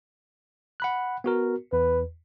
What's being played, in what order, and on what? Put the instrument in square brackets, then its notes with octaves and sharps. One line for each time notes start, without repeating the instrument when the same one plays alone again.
[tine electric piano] F#5 B5 F#6
B3 F#4 A#4
[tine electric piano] E2 [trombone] B4